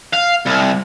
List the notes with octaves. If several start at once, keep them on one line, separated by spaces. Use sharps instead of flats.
F5
C2